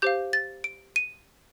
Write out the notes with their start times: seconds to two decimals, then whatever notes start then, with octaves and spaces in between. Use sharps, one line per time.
0.02 G4 C5 F5 G6
0.33 A6
0.64 D7
0.96 D#7